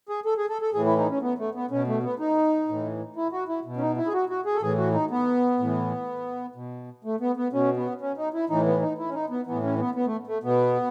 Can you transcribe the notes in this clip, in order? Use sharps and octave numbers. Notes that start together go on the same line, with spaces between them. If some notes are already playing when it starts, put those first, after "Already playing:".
G#4
A4
G#4
A4
A4
A2 E3 G#4
E4
D#4
C#4
B3
A3
B3
B2 C#4
A3
B3
D#4
A2 E3
E4
F#4
E4
B2
C#4
D#4
E4
G#4
F#4
F#4
G#4
A4
A2 E3 G#4
F#4
D#4
B3
A2 E3
B2
A3
B3
B3
B2 C#4
B3
C#4
D#4
E4
A2 E3 D#4
B3
D#4
E4
C#4
D#4
B3
A2 E3 B3
C#4
B3
B3
A3
A3
B2 B3